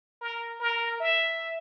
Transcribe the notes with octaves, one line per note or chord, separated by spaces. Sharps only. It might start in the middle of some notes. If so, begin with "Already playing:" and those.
A#4
A#4
E5